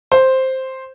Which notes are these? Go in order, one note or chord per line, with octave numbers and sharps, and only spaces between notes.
C5